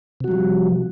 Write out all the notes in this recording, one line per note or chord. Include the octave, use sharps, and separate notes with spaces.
C3 F3 G3 F#4